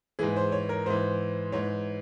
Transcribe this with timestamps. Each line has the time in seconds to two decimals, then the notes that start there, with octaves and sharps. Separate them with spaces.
0.19 G#2 E3 G#4
0.36 C5
0.52 C#5
0.69 A#4
0.86 G#2 E3 C5
1.52 G#2 E3 C#5